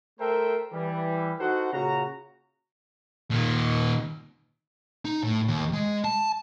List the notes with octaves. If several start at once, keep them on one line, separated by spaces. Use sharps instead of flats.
A3 A4 A#4 C5 E5 G5
E3 G3
D#4 F#4 A4 C5 F#5
A#2 C#3 F#4 A#5
A#2 D#3
D#4
A2
D#2
G#3
A5